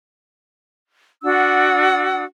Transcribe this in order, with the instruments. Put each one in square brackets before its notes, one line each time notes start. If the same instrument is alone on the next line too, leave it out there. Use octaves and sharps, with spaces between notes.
[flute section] D4 F#4 F#5 E6